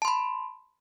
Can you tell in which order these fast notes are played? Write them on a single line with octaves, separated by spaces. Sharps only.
A5 C6 B5